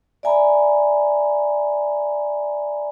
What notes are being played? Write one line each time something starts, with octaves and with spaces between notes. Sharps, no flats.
D5 E5 G#5 A#5 B5